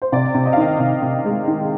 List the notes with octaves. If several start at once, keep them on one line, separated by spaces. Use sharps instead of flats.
C5
C3 D5
C3
D#5
F5
D#3 D#5
C3
C3
G#3
D#3